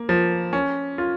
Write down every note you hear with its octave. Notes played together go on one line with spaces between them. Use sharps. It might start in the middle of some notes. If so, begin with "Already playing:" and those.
Already playing: A#3
F3
C#4
F4